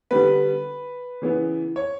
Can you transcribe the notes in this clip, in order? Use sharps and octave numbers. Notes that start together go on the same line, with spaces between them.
D3 G3 B3 B4
C#3 E3 B3
C#5